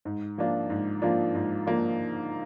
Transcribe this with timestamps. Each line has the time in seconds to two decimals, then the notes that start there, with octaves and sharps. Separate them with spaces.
0.05 G#2
0.38 F3 A#3 D4 F4
0.70 G#2
1.02 F3 A#3 D4 F4
1.35 G#2
1.67 F3 A#3 D4 F4